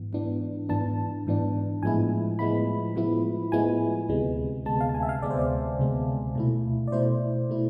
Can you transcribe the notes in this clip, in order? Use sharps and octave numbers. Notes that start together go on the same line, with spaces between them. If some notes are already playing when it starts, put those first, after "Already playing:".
Already playing: G#2 E3 B3
G#2 E3 B3 D4
G#2 E3 B3 D4 A5
G#2 E3 B3 D4
A2 F3 G#3 B3 E4 G#5
A2 F3 G#3 B3 E4 B5
A2 F3 G#3 B3 E4
A2 F3 G#3 B3 E4 G#5
D2 C3 G#3 B3
D2 C3 G#3 B3 A5
F5
A5
G#5
E5
F5
D2 C3 G#3 B3 D5
C5
D5
D2 C3 G#3 B3
B2 A3 E4
D5
B2 A3 E4 C5
B2 A3 E4